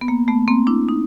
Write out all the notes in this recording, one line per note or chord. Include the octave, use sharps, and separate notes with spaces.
B3
A#3
A3 B3
A#3 C4
D4 E4
D#4